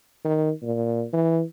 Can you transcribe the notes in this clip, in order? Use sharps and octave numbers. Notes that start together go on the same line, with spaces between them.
D#3
A#2
E3